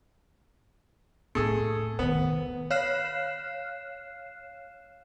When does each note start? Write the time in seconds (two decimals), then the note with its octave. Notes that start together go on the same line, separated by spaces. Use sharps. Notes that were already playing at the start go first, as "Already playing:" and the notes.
1.35 A2 A3 A#3 G#4
1.99 D#3 A3 B3
2.71 C#5 F5 F6 F#6 C7 E7